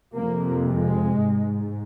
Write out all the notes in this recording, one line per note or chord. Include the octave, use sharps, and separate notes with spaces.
F2 C3 A#3
G#3
G#2